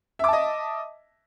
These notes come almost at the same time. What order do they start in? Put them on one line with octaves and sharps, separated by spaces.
E5 D6 A5 D#5